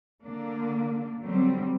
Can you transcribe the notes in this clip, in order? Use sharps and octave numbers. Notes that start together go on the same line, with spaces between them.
D3 A#3 D4
D3 F#3 G3 C4